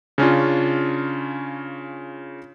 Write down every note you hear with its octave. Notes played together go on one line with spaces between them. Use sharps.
C#3 C#4 D4 F4